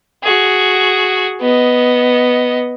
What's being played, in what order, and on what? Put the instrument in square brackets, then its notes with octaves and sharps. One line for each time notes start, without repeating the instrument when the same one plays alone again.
[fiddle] F#4 G#4
B3 D#5